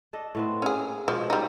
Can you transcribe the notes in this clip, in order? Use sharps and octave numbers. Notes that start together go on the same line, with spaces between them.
D4 A4 D#5
A2 B3 C4
A#3 C#4 G#4
B2 F3 G#3 C#4
G3 D#4